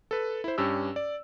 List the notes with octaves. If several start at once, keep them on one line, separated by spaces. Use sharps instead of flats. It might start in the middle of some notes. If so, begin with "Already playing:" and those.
A4 B4
E4 C5
G2 C#4 G4 E6
D5